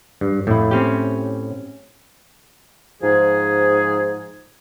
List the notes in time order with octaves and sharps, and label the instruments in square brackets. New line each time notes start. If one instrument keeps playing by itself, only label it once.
[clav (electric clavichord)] G2
[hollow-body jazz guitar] F2 [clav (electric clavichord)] A2 E4
[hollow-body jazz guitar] C4 C#4 G4
[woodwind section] G#2 F3 G#4